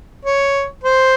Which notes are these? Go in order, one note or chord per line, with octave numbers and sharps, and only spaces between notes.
C#5
C5